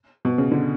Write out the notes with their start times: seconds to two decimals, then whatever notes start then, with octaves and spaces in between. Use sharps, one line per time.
0.25 B2
0.38 C#3
0.52 D3